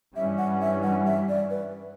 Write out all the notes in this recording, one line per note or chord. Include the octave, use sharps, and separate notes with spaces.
G2 E3 G3 C#4 E5
F#5
E5
F#5
E5
D5
B4